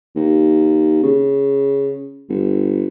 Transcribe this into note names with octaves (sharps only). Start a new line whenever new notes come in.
D#2
C#3
G1